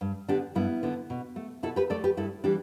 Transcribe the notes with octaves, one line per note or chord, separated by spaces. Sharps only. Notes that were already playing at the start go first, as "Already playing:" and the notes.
G2
D3 B3 D4 G4
G2 B3 E4
D3 B3
B2
A3
B2 E4 A4
G4 B4
A3 A4 D5
G4 B4
G2 E4 A4
E3 G3 D4 G4